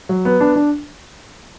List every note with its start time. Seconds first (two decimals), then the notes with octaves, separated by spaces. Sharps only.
0.09 F#3
0.25 B3
0.40 D4
0.56 D4